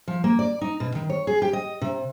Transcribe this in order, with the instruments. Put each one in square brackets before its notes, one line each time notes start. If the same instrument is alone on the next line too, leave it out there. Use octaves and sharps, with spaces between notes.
[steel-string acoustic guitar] F3
A#3
D5
D#4
B2
D#3
C#5
G#4
G4
D#5
C3